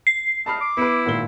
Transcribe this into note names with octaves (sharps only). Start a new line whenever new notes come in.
C7
E2 A3 D#5 A5 B5 F6
D6
B3 E4 B4
G#1 A#2 G7